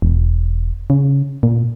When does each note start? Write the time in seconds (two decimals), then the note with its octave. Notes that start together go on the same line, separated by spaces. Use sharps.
0.02 E1
0.90 C#3
1.43 A#2